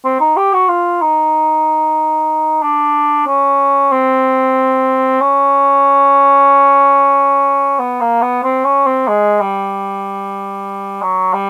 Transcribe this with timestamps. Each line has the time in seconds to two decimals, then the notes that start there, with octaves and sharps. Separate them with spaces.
0.04 C4
0.20 D#4
0.37 G4
0.53 F#4
0.68 F4
1.01 D#4
2.63 D4
3.27 C#4
3.92 C4
5.21 C#4
7.79 B3
8.01 A#3
8.22 B3
8.44 C4
8.65 C#4
8.86 C4
9.08 G#3
9.41 G3
11.02 F#3
11.34 G3